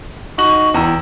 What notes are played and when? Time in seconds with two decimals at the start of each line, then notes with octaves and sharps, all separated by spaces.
0.38 D#4 F#4 C#6 F#7
0.74 E2 G5 A#5 E6